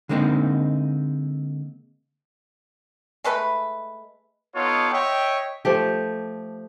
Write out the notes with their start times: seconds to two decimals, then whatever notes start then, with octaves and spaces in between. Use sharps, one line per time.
0.09 D3 G#3 A#3 C4 D#4
3.24 G#3 A3 B4 B5
4.54 B3 D#4 F4 A4 C#5
4.91 C#5 D#5 E5 G5
5.65 F3 A3 G4